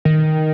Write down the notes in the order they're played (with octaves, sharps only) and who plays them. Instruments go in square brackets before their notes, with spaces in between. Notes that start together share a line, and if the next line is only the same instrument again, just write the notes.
[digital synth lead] D#3